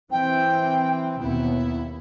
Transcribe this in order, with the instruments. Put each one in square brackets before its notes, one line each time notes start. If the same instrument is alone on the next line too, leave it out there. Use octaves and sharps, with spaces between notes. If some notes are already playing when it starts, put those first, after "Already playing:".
[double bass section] E3 C4 [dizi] G5
[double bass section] D#2 B2 B3 [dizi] E4